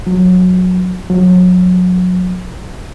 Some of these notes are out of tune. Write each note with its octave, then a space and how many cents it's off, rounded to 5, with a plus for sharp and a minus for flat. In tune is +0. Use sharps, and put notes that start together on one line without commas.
F#3 -20
F#3 -30